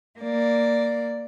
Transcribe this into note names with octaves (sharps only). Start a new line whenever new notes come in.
A#3 D5